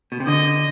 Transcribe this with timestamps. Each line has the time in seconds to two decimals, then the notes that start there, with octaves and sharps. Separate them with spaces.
0.12 B2
0.20 C3
0.27 D3 D#5